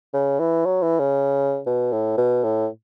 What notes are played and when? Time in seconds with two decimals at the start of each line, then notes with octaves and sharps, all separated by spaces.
0.13 C#3
0.39 E3
0.66 F#3
0.82 E3
0.99 C#3
1.66 B2
1.92 A2
2.17 B2
2.44 A2